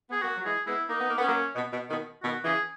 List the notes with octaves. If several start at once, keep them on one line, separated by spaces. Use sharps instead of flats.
B3 G#4
F#3 A#3 F#4
F#3
E3 G#3 G#4
G#3 B3 E4
A#3 D#4
B3
A#3
B3
C#4
F#3 A#3
B2
B2
B2 D#3
B2 D#3 F#4
C#3 E3 G#4